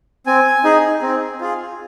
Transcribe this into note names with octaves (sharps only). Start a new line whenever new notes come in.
C4 G#5
D#4 G#4
C4
F4 G#4